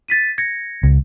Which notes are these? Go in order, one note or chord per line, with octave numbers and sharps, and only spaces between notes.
A6 B6 D#7
G#6 A#6 C#7
C#2